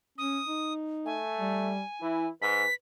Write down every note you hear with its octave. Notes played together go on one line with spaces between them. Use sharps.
C#4 D#6
D#4
A3 G#5
G3
E3 E4
G#2 B4 B6